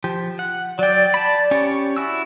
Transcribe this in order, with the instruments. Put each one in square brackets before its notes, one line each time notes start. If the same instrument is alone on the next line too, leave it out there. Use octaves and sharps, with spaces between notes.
[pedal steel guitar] F3 G4
F#5
[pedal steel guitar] F#3 G5 [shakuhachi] D5
[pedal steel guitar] A5 B5
C#4 G4 C#5
E4 F#4 E6